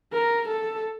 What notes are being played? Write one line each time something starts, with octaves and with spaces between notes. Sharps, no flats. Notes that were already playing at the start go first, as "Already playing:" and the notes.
A#4
A4